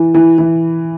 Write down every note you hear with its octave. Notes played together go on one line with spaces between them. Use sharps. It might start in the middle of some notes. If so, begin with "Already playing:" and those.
Already playing: E3
E3
E3